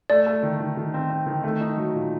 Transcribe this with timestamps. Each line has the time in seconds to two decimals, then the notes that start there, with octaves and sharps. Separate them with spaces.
0.10 A3 D5
0.26 A3
0.43 D#3
0.60 D#3
0.77 D#3
0.94 C4
1.10 C4
1.26 D#3
1.43 A3
1.61 D#4
1.77 F#3
1.94 A#2